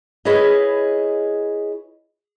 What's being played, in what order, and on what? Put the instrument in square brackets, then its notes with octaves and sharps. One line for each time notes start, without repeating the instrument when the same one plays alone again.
[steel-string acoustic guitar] E4 G#4 B4 C#5 D#5